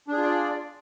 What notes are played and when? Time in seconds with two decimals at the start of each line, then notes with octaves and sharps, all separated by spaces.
0.08 D4
0.13 G#4
0.17 F4
0.22 D5